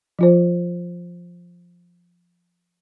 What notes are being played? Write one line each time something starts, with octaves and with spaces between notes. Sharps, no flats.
F3 F4 C5